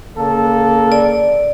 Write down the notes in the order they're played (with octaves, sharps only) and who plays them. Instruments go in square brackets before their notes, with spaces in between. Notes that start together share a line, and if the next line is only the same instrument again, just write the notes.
[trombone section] C#3 A#3 A4
[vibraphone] D5